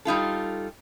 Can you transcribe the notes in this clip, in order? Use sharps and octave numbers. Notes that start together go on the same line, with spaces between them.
G3 D#4 F4 A4